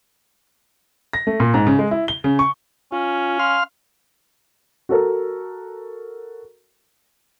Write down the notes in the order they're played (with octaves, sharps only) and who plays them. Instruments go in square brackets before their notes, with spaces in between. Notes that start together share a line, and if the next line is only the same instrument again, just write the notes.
[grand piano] A#6
A3
A#2
G#2
C#3
G#3
E4
G7
C#3
C#6
[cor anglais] C#4 [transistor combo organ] F4
[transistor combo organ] F5 C6 F6
[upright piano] F#4 A4 A#4